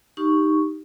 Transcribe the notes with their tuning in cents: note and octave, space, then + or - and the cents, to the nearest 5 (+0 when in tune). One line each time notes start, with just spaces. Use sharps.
D#4 +0 G4 +0 C#6 +0